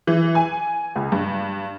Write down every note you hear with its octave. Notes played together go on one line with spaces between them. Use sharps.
E3
G#5
C#2
G2